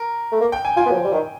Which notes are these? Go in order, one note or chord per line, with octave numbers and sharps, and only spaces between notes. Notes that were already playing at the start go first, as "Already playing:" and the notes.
Already playing: A#4
A3
A#3
G5
G#5
F4 G#5
B3
F#3
F3
G3
D#3